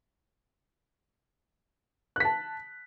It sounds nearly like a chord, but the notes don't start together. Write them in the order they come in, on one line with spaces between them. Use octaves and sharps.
F#6 B6 A5